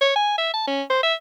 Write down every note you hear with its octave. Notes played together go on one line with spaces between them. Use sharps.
C#5
G#5
E5
A5
C#4
C5
E5